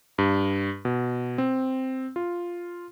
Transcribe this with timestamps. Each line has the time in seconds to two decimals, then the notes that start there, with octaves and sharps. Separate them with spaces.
0.18 G2
0.85 B2
1.38 C4
2.16 F4